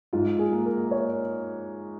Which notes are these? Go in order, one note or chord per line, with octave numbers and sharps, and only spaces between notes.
G#2 F4
G#4
A#3
A#4
C#5